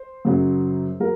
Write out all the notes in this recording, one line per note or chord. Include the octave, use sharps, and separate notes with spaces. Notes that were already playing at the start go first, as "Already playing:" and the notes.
Already playing: C5
F#2 C#3 F#3
F#3 A#4